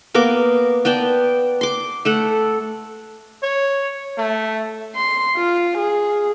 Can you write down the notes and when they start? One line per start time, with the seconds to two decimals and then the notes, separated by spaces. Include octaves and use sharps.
0.14 A#3 B3 A#4 D6
0.85 B3 D5 G5 A5
1.61 C6 D6
2.05 A3 A4 F#5
3.43 C#5
4.18 A3
4.96 C6
5.37 F4
5.78 G#4